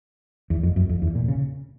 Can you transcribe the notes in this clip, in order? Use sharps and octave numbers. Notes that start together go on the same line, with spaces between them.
E2
F2
F#2
F2
E2
A#2
C#3